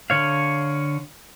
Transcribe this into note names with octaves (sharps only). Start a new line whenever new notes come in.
D3 C#5 F5